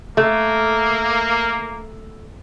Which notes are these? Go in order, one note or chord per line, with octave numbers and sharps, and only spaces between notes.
A3 A#3